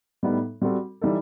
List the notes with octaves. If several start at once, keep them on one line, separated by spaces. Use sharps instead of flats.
A2 G3 B3 D#4
G3 C4 F#4 A4
E3 G3 D#4 A4